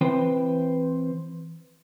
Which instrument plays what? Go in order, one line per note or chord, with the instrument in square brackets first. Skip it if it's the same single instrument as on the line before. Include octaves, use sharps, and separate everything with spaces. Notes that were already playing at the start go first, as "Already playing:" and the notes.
[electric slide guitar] E3 C4 B4 C5 G5